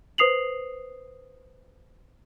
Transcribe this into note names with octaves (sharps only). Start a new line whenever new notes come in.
B4 C5 D#6 C7 F7 F#7